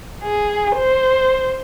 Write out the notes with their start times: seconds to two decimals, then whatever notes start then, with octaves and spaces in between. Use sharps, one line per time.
0.23 G#4
0.75 C5